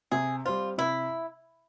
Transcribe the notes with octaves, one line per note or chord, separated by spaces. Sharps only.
C3 G#4
G3 C4 F4
C3 E4